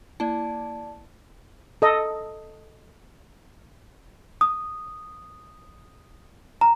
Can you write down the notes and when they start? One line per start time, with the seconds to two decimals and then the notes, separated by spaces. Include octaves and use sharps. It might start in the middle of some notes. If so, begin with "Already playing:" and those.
0.20 A#3 E4 D5 A5
1.82 A4 D#5
4.41 D#6
6.61 A#5